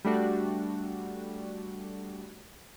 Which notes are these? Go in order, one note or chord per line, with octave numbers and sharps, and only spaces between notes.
G3 A3 D4 F#4